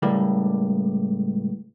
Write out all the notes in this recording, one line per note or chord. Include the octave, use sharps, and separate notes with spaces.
C#2 A2 G3 A#3